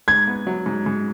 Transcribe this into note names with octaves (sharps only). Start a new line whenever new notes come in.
G#2 G#6
B3
F#3
G#2
G#2